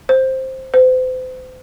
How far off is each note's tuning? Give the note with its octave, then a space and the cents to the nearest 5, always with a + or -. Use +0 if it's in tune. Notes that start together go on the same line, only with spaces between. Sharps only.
C5 +5
C5 -40